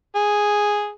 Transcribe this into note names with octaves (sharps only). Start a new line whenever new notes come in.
G#4